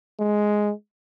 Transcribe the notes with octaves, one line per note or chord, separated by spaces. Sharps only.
G#3